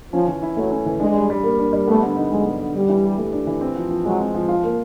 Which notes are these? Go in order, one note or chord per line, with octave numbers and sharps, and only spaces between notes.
F3 C#4
E3
E4
F#3 A3
C#4
E3
G#3 D4
G3
G3
A#3
D4
G3
A3 B3
D3
D#4
F#3 G#3
B3
D3
G3 D4
E3
G4
A3
D4
E3
C4
F3
F3
F#3 G#3
C4
F3
F3 F4
A#3